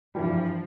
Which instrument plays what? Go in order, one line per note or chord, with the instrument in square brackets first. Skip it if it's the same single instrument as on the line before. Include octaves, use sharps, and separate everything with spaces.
[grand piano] G2 E3 G3 [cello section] F3